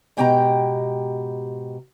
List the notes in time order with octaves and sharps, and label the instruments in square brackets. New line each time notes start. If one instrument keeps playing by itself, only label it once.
[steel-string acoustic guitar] G#2 B2 G4 G5 G#5 A#5